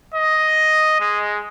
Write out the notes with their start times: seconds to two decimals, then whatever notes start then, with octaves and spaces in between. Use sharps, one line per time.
0.15 D#5
1.01 G#3